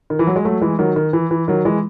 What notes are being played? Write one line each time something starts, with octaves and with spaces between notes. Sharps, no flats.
D#3
E3
F#3
G#3
F#3 A3
E3 G#3
D#3 F#3
D#3
E3
E3
D#3 F#3
E3 G#3